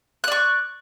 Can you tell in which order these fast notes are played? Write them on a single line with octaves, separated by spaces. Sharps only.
F#6 D5 C#6